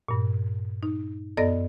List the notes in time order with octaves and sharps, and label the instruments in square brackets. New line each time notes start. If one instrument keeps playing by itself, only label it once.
[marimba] G2 A#2
D#4
F#2 B3 A4 D5 D#5 A#6